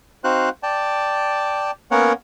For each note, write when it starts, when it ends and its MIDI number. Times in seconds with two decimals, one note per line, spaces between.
0.24 0.49 60
0.24 0.49 63
0.24 0.49 66
0.24 0.49 72
0.24 0.49 77
0.24 0.49 90
0.63 1.71 74
0.63 1.71 79
0.63 1.71 81
1.91 2.13 58
1.91 2.13 59
1.91 2.13 61
1.91 2.13 70
1.91 2.13 73
1.91 2.13 78